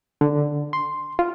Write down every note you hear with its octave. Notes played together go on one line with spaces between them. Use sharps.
D3
C6
F4